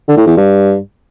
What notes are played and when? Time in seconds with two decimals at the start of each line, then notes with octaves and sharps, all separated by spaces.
0.08 D3
0.17 A2
0.26 E2
0.37 G2